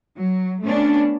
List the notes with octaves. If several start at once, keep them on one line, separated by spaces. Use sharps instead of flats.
F#3
A3 B3 C#4 D4